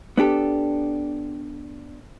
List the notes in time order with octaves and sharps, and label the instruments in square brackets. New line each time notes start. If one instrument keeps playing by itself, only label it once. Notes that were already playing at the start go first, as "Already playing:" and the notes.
[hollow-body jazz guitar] B3 D4 G4 A4